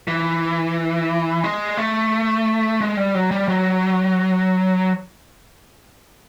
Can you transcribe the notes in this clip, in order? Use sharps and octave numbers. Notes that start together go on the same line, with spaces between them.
E3
G#3
A3
G#3
G3
F#3
G3
F#3